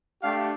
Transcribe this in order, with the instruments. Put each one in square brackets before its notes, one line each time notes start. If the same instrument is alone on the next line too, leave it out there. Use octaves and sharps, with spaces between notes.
[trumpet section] A3 D4 G4 F5